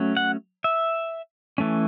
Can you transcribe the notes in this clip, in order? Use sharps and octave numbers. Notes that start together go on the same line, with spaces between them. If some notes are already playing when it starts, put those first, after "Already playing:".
Already playing: F#3 A3 C#4
F#5
E5
E3 A3 C#4